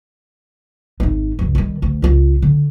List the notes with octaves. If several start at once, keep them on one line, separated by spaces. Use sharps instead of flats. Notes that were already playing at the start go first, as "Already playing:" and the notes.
G#1 D#4
C#2 G2
D#3 G3
D2
C#2 F4
D3